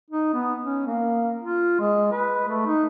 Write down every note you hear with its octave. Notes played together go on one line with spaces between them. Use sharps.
D#4
B3
C#4
A#3
F4
G#3
B4
A3
D#4